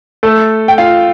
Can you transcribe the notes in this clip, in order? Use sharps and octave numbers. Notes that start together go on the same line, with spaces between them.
A3 A4
G5
F4 F5